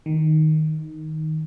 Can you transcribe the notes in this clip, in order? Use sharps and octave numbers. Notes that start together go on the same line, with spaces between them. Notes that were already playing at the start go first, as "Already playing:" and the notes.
D#3